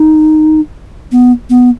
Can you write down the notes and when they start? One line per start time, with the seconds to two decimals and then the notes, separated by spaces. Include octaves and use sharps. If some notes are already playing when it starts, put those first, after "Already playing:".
Already playing: D#4
1.12 B3
1.50 B3